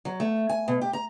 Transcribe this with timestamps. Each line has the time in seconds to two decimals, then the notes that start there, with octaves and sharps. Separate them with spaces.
0.05 F#3
0.20 A3
0.49 G#5
0.68 B2
0.81 G4
0.93 A#5